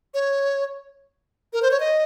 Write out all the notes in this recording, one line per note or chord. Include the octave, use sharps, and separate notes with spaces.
C#5
A#4
C5
C#5
D#5